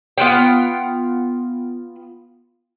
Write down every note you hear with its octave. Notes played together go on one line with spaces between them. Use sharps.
B3 F4 F#5 G5